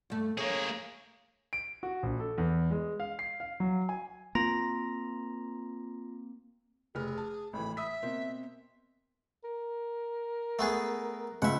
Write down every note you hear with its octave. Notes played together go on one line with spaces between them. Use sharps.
G2 A3
A#3 G#4 C#5
D7
F#4
A#1
A4
E2
G#3
F5
C7
F5
F#3
G#5
A#3 C4 F4 A#5 A#6
F1 G#4 B4 F6
A5
G#1 A2 E3 B5
E5 D#6 E6 B6
B2 A#3 C4
A#4
A3 B3 G#4
C#2 E5 F#5